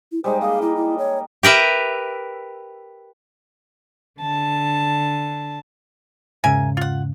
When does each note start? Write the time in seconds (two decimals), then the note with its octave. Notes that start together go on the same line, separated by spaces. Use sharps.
0.12 E4
0.24 G3 G#3 D#4 C5
0.41 A#3 D#5 F5
0.62 D#4 E4
0.76 E4
0.98 C#5
1.43 G4 A#4 B4 E5
4.20 D3 A5
6.44 E2 G#2 C#3 A#4 E5 G#5
6.77 F4 F#5